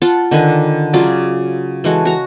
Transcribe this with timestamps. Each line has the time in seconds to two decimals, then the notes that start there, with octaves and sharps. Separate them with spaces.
0.02 F4 F#5 A5
0.31 D3 D#3 B4 G#5
0.93 C#3 F#3 F4 D5
1.84 E3 G#3 F#4 A4
2.05 F#4 A#5